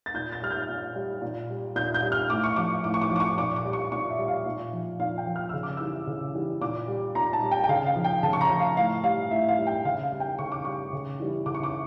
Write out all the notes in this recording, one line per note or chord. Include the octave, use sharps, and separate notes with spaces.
A6
A#2 G6
A6
G3 F6
G6
A#2
G3
A#2
G3
A#2 G6
G6
G3
F6
A2 D6
C#6
F3 D6
A2 D6
C#6
D6
F3
D6
C#6
A#2 D6
D6
G3
C#6
A#2 C#6
E5
G3
F5
A#2
F3
A#2 F5
G5
F3
F6
C#3 E6
D6
E3 G3 E6
C#3
E3 G3
A#2 D6
G3
A#2 A#5
A5
G3
G5
G5
C#3 F5
F5
F3
G5
C#3 A5
C#6
A#5
F3
F5
A2 F5
G3 F5
A2 E5
F5
G3
G5
C#3 F5
F5
G3
G5
C#3 C#6
D6
G3 C#6
C#3
E3 G3
C#3 D6
C#6
D6